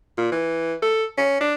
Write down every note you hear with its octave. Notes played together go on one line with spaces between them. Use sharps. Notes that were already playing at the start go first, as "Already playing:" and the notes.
A#2
E3
A4
C#4
D4